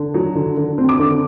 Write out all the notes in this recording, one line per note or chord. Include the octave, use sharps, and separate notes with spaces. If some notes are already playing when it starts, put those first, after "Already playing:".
Already playing: D3
F#3
D3
D3
C4
D6
D3